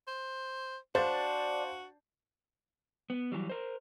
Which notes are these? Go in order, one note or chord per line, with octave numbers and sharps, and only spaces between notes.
C5
D4 F#4 C5 F5 A6
B3
E3 F#3 G3
A#4 C5